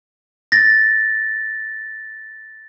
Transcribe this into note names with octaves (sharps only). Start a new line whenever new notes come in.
A6 A#6